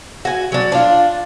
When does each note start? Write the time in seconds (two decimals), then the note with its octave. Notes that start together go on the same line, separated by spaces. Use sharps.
0.25 F#4 G#5
0.52 F#3 D4
0.72 D4 F4